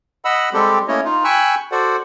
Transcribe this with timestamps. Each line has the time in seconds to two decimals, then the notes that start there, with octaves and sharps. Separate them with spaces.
0.25 D#5 F#5 B5 E6
0.53 G3 G#3 C4 G4 A4
0.88 A3 A#3 C#4 E4 C#5 D#5
1.04 D#4 F4
1.24 G5 G#5 B5 C#6 E6 F#6
1.72 F#4 A4 C5 D5 F#5